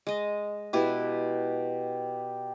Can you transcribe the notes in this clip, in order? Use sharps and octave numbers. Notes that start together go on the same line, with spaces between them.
G#3 D#5
B2 E4 G4 B4